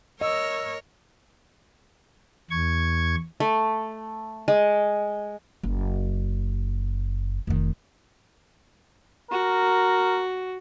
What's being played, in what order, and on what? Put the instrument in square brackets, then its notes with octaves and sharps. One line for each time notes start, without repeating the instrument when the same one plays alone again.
[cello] A#4 C#5 [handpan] D#5 [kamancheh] E6
[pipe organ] E2 C#6 G#6
[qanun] A3
G#3
[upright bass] F#1
F1 D#3
[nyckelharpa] F#4 [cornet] A#4